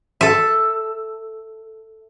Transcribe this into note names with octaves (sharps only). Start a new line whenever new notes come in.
A4 E5